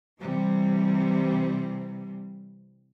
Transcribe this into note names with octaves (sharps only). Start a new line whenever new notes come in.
C3 E3 G3